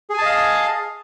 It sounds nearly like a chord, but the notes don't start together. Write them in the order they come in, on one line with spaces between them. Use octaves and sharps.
G#4 G#5 A5 D#5 F5